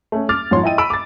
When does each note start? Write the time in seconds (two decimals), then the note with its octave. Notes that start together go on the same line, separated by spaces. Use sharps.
0.12 A3 C#4
0.29 D6 F6 A6
0.51 G#2 F3 C#5 C6
0.63 E4 D#5 G5 D#7
0.78 B5 E6 D7
0.90 D6 A6